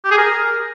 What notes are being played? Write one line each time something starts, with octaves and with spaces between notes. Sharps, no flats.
G4
G#4
A#4